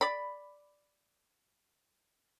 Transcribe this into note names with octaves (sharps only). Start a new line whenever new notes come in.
D5 B5